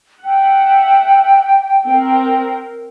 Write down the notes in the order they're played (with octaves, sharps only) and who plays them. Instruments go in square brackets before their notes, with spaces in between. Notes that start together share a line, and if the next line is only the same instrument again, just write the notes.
[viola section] E5 F#5 [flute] G5
[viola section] C4 A#4